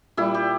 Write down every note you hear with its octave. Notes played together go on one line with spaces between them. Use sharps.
A#2 G3 E4
G4